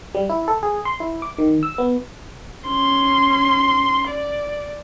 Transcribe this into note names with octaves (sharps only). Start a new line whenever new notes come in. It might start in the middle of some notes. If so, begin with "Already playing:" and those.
G3
E4
A4
G#4
C6
E4
D6
D#3
E6
B3
C#4 C6
D5